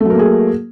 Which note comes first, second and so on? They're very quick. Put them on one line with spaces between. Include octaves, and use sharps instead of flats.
A3 F#3 A#4 A#3 G#4